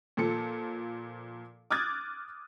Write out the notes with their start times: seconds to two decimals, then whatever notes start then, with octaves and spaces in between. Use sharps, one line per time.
0.17 A#2 F3 A4 C#7
1.71 D6 D#6 F6 F#6 G#6 A6